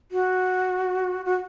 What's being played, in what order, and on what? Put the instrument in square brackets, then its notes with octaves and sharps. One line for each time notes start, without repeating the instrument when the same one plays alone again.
[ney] F#4
F#4